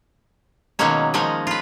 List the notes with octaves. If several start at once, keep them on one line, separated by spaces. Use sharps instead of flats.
B2 D#3 F#3 G#3 A#3 C#4
D#3 F3 G#3 C#4 D#5
F4 B4